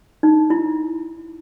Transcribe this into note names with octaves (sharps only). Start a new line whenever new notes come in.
D#4
E4